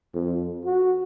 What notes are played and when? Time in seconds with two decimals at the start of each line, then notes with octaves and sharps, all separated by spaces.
0.14 F2
0.65 F#4